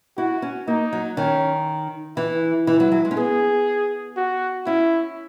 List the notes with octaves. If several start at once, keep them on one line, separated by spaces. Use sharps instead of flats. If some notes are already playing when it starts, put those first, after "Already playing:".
E4 F#4
C#4
A#3 D#4
F#3
D#3 C#4
E3 E4
E3 E4
F#3
F#3
G#3
C#4
B3 G#4
F#4
C#4 E4